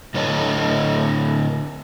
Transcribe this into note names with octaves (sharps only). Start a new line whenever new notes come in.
A2 D3 C#5 D#5 A5